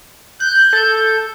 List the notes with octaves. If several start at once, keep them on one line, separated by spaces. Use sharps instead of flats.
F#6 G6
A4